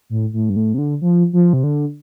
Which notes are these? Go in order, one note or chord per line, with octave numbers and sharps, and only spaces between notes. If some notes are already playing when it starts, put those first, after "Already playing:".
A2
A2
G2
A2
C3
D3
F3
F3
C3
D3